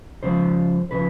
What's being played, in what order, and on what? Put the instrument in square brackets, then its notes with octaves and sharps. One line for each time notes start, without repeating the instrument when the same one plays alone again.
[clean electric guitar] C#2 C#3 F3 C5
C#3 F3 B4